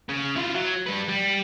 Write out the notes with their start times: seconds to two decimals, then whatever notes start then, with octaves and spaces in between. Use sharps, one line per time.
0.09 C#3
0.36 E4 F4
0.54 F#3
0.86 G3 B4
1.08 G3